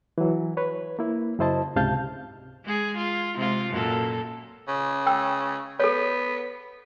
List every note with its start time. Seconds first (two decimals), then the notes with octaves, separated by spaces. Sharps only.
0.18 E3 F#3
0.57 B4 C#5
0.99 A#3 E4
1.39 F#2 C#3 E4 C5 D#5 A5
1.76 C#2 G#2 C3 F5 A5 G6
2.64 G#3 G#4
2.97 F4
3.36 C3 G#3 F4
3.70 F#2 A#2 A4
4.68 C#3
5.06 G5 E6
5.80 B3 A4 C#5